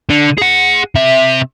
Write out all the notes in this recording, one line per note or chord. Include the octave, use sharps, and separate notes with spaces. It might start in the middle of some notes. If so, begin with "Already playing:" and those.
D3
G#4 F#5
C3 E5